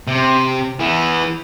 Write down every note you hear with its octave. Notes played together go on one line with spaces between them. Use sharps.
C3
E3 B3